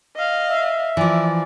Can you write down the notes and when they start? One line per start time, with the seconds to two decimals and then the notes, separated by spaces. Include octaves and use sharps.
0.16 D#5 F5
0.48 E5
0.97 E3 F3 D5